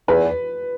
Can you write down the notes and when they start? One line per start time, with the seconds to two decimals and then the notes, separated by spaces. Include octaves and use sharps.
0.08 E2 B4